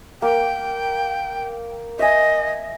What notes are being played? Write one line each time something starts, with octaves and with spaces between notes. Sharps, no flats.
A#3 G5
D#5 E5 G#5